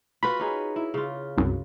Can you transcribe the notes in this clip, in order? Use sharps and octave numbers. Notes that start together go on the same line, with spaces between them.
F4 F#4 B4 B5
C#4 D#4 G#4
E4
C#3 F4
C2 F#2